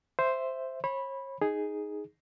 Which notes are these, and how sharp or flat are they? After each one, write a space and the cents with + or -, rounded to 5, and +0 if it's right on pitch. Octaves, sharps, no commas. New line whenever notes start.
C5 +0 E5 +5
C#5 -40 B5 -5
D#4 +0 G#4 +0